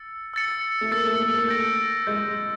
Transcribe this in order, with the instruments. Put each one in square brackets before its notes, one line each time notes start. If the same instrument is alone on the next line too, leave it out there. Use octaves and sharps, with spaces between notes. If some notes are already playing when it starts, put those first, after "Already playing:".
Already playing: [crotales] E6 A6 C#7
E6 A6 C#7
[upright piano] A3
[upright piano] A#3 [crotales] E6 A6 C#7
[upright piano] A3
A#3
A3
[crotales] G6 A#6 D7
[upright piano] G#3 [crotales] G6 A#6 D7